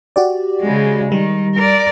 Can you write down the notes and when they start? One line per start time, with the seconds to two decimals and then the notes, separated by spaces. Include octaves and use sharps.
0.16 F#4 G4 D5
0.61 C#3 G#3
1.12 D#3 G3
1.55 A#4 D5